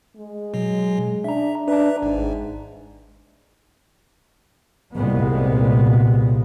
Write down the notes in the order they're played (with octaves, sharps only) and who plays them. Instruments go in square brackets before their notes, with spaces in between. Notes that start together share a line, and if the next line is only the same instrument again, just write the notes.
[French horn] G#3
[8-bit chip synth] B2 F#3
[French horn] D4 [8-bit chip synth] E5 A#5
[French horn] D4 [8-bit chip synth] B4 E5 A#5
[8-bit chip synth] G#1 [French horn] G#2
[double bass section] C2 A#2 G#3 B3